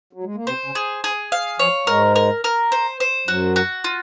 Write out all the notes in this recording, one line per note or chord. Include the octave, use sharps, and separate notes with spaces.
F#3
G#3
A#3
C3 C4 C5
C#3 C#4
G#4
G#4
F5
F3 C#5
G#2 G#3 A#4
A#4
A#4
C5
C5
F#2 F#3 F#4
F#4
F4